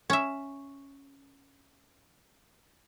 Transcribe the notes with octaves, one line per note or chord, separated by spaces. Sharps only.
C#4 E5